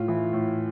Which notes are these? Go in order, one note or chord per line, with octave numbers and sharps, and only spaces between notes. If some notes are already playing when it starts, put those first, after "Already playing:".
Already playing: A2 F4
E3
A2